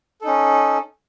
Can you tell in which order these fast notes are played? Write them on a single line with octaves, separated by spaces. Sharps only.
A4 D#4 C#4